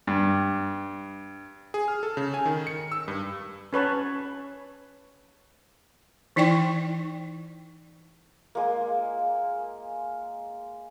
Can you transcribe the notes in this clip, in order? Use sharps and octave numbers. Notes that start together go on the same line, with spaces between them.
G2
G#4
F6
A4
C#3
G#5
D#3
C#7
E6
G2
C#4 B4 C#5 A5
E3 D#4 E4 D5 G5 C#6
G#3 A#3